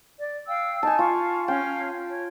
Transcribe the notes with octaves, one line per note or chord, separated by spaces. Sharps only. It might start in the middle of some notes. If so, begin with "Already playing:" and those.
D5
F5 G5 E6
D#4 G#5 A5
F4 F5 C#6
C#4 F5 G5
C#5